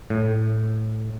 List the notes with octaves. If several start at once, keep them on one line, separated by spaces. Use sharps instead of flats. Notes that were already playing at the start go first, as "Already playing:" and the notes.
A2